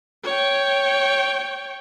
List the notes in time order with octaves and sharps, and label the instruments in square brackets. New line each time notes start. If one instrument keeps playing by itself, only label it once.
[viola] C#5 G5